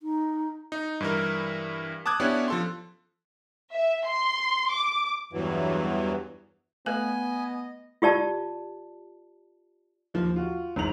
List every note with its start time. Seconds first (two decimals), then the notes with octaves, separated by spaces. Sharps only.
0.02 D#4
0.72 D#4
1.01 G2 E3 A#4
2.06 A5 D6 D#6 F#6 G#6
2.20 B3 C#4 D4 E4 G4 C#5
2.48 F3 A4 C6
3.73 E5
4.07 C6
4.72 D6
5.33 E2 G2 E3 F#3
6.86 A3 B3 A4 B4 D#5 G#5
8.02 F4 G4 D5 A5
10.14 D#2 F3
10.36 F4 F#4
10.76 G1 E2 G#2 A#5 F7 F#7